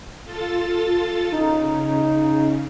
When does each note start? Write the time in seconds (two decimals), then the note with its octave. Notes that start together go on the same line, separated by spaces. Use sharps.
0.23 F4 A4 A6
1.32 C#3 D#4